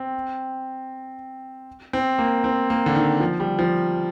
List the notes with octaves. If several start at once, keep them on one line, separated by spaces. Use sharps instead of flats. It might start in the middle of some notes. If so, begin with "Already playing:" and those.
Already playing: C4
C4
A#3
C4
A#3
D3
D#3
F3
G3
F3